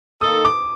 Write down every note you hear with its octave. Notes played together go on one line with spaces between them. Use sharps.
D#3 A#3 D#4 A4 D#6
D6